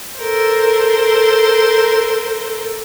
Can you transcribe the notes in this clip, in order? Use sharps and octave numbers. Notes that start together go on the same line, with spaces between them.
A4 A#4 C5